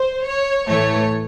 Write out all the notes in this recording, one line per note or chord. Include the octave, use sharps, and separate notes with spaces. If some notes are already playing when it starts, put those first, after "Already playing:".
Already playing: C5
C#5
A2 E3 A3 C#5